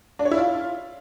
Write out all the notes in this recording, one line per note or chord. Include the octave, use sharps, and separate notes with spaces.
D4
C#5
E4
F4